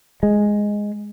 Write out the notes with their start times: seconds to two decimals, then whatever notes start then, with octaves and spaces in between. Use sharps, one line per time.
0.23 G#3